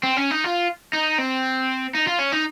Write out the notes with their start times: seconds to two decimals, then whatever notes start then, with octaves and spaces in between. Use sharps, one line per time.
0.03 C4
0.17 C#4
0.31 D#4
0.44 F4
0.93 D#4
1.19 C4
1.95 D#4
2.07 F4
2.19 C#4
2.33 D#4